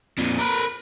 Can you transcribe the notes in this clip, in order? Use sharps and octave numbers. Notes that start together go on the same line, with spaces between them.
F2 A#2
A#4 B4